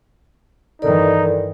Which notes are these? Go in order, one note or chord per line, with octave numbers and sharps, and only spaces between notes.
G2 D#3 E3 D#4 A4 A#4 D5